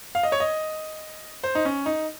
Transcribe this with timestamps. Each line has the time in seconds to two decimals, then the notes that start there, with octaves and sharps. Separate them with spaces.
0.15 F5
0.23 D#5
0.32 C#5
0.40 D#5
1.44 C5
1.55 D#4
1.65 C#4
1.86 D#4